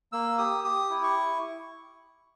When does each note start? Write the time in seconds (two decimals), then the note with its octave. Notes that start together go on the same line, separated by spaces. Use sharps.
0.12 A#3 E6
0.38 G4 D#6
0.64 G4 D#6
0.90 E4
1.03 C#6